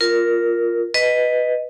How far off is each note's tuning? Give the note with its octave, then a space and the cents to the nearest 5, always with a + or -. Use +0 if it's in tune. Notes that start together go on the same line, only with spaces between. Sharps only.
F4 +0 A#4 +0
B4 +5 D#5 +0